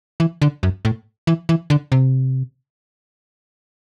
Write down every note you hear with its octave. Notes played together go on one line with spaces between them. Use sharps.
E3
D3
F#2
A2
E3
E3
D3
C3